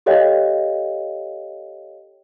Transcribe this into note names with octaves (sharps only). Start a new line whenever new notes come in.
G4 A4 C#5 D#5 F5 G5